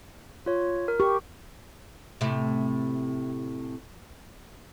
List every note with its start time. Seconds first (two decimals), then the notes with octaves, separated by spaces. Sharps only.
0.46 F4 C#5
0.88 A#4
1.00 G4 C#6
2.21 A2 C3